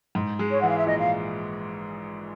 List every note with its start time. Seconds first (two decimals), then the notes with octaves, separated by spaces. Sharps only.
0.15 G#2
0.39 G#3
0.50 C#5
0.60 E3 F#5
0.69 F5
0.77 E5
0.86 A#1 D#5
0.99 F5